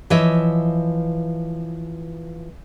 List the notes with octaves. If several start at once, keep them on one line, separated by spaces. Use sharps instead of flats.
E3 F3 C#5 D#5 E5